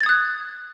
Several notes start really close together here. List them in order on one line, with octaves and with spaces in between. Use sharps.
A6 G#6 D#6 F#6